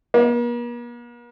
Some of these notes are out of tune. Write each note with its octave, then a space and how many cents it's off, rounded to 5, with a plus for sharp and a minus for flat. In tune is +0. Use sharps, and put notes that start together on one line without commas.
A#3 +45